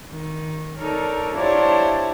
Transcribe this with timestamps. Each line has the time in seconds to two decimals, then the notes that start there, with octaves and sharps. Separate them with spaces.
0.10 D#3
0.76 D4 D#4 A4 A#4 C#5
1.33 D4 E4 F4 G4 C5 C#5